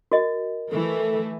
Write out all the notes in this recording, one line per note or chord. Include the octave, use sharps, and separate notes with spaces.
F#4 A#4 D#5
E3 A3 A4